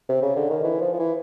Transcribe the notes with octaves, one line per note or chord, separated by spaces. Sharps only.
C3
C#3
D3
D#3
E3
F3
F3
E3